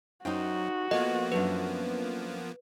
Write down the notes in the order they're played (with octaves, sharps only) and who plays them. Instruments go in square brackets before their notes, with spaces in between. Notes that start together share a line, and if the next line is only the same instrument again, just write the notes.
[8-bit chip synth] F#2 [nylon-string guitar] D#4 C5 G5 [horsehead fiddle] F#4
[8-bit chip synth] F3 A#3 B3 [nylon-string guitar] A4 [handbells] D#5
[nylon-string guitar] F#2 A3 D4 [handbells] B4